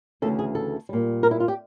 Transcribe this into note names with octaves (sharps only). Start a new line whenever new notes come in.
D2 C#3 E3 A4
G#4
A4
A#2 G3
A#4
E4
F4
G4